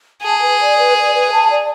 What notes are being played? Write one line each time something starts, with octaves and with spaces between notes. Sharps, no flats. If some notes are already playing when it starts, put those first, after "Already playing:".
G#4 A5
B4
D5
B4
D5
B4
A5
D5